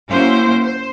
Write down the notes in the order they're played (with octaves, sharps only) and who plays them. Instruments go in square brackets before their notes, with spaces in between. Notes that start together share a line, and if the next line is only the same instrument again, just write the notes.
[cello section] A#3 C#4 E4 F#4 C5
C5